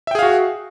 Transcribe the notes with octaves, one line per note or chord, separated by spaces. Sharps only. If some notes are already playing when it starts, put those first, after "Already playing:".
F#4 G#4 E5 F5 G5